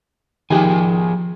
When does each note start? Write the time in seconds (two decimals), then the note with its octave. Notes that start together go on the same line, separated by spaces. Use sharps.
0.50 D#3 F3 G4 G#4 G#5